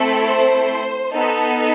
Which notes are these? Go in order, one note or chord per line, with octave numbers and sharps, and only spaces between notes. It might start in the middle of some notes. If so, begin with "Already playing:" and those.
Already playing: A3 C4 E4 A4
C5
B3 D#4 A4